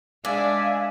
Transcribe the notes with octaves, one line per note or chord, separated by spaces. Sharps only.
G#3 D4 D5 E5 F5 G#5